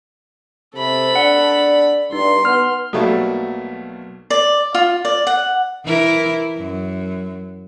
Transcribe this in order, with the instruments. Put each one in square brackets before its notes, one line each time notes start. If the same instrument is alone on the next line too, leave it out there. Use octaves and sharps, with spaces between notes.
[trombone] C3 [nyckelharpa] A4 B5
[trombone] D4 [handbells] F#5
[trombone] G2 [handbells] D#4 [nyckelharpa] C6
[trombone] B3 [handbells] F6
[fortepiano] B1 F#3 G3 A3 A#3 A5
[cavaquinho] D5
F4
D5
F#5
[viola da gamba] E3 E4 A#4
F#2